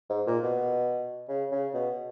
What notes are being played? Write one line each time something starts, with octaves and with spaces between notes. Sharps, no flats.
G#2
A#2
B2
C#3
C#3
B2